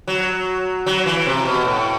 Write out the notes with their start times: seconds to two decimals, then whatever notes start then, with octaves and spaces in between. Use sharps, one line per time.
0.08 F#3
0.86 F#3
1.06 E3
1.26 C3
1.45 B2
1.65 A2